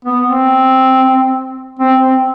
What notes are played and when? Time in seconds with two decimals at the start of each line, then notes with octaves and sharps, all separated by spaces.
0.05 B3
0.27 C4
1.80 C4
2.00 C4